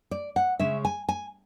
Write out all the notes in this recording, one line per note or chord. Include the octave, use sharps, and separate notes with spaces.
D5
F#5
C#3 G#3 C#4 E5
G#5
G#5